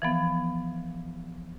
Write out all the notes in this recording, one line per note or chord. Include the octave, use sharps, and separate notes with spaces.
E3 F3 B3